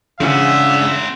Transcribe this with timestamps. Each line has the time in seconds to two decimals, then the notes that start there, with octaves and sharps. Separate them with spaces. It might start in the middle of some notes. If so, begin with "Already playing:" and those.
0.20 G#2 C#3 C4 D4 F4 E5 F#5